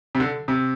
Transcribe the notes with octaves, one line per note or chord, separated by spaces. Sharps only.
C3
D3
C3